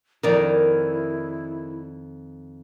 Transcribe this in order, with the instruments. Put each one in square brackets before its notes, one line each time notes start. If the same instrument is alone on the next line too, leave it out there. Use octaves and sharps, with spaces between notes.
[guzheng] F2 D#3 [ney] E4 [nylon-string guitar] A#4 D5